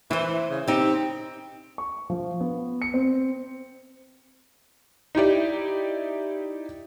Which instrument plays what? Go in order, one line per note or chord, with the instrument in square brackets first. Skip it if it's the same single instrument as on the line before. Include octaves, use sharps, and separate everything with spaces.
[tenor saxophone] E3 [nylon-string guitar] E4 C5
[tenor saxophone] C#3
[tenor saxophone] C4 [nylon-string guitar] D#4 G4
[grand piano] C#6
F3
B3
C#7
C4
[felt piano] D#4 E4 G4 D5